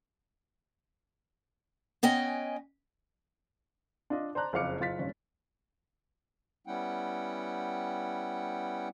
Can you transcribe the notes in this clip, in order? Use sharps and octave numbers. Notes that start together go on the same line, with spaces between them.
B3 C#4 D#5 G5 G#5
D4 F4 D#5
C5 D5 A5 A#5 F#6
F#1 F2 C#3 F5 D6 C#7
F#1 F4 A6 B6
G#1 G2 C#4
G3 B3 C#4 E4 F#5 G5